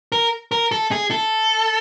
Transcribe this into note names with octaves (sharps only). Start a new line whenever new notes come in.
A#4
A#4
A4
G#4
A4